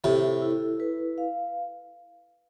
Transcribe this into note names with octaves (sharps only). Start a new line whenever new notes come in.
A2 C3 A4
E4
B4
F5